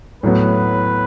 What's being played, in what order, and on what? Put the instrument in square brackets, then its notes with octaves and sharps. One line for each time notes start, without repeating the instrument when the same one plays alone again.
[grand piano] A2 F#3 B3 [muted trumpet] B4